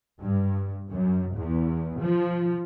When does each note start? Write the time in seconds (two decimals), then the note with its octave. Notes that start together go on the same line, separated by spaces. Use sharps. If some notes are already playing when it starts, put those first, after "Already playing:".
0.21 G2
0.92 F#2
1.37 E2
2.00 F3